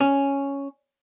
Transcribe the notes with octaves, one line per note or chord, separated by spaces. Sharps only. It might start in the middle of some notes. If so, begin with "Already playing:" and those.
C#4